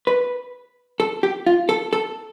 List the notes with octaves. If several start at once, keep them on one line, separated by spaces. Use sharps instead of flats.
B4
A4
G4
F4
A4
A4